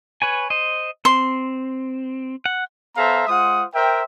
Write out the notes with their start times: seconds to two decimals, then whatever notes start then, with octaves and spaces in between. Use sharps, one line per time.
0.22 B4 C#5 G#5
0.50 C5 D#5
1.05 C4 C6
2.46 F#5
2.97 B3 A4 C5 E5 F5 A#5
3.28 G#3 F4 C5 F#5 D#6
3.74 A#4 C5 E5 G5